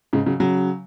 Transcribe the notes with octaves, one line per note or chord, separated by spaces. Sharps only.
G#2 C#3
C#3 F#3
C#3 F#3